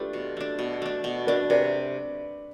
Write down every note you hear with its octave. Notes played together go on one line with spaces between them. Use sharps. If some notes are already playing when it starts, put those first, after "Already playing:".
Already playing: A3 D4 F4 G4 A4 B4
B2
A3 D4
B2
A3 D4
B2
A3 D4 B4 D5
C3 B4 D5